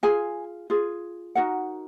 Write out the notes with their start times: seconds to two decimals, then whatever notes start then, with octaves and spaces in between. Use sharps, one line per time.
0.03 F4 G#4 G#5
0.70 F4 G#4
1.35 D#4 F#4 A#4 F#5